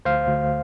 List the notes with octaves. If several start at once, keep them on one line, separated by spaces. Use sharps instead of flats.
D2 C5 F5
D2